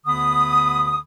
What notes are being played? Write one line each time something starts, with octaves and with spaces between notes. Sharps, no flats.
D2 D3 B3 B5 D#6